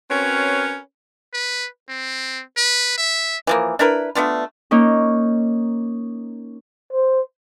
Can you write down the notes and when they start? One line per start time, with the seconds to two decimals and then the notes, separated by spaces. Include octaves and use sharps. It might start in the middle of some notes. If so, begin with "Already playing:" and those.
0.10 C4 C#4 F#4 A#4 B4 C#5
1.33 B4
1.89 C4
2.57 B4
2.98 E5
3.47 E3 F3 A#3
3.79 D4 E4 A#4 B4
4.15 A3 B3 D4 F4
4.71 A#3 C#4 D#4
6.93 C5